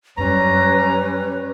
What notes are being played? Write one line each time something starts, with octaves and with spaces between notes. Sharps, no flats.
F#2 G3 C#4 B4 A#5